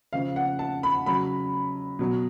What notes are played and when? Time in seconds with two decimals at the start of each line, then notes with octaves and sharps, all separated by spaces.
0.13 C#3 F3 F5
0.36 F#5
0.59 A5
0.83 B5
1.06 C#3 F#3 B5
1.99 B2 F#3